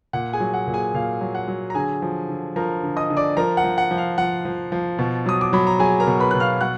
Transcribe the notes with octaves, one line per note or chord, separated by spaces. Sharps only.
A#2 F#5
G#4 G#5
F#3
F#5
A#2
G#4 G#5
A#2 F5
F#3
F#5
F#3
A#5
D3 G#4 G#5
F3
D3
F3 A#4 A#5
D3
D#5 D#6
D3
D5 D6
F3 A#4 A#5
F#5
F3
F#5
F3
F5
F3 F#5
F3
F3
B2
F#3 D#6
D6
F#3 B5
A#5
F#3 G#4 G#5
A#4 A#5
B2
B4 B5
B2 F#6
F5 F6
F#3 F#5 F#6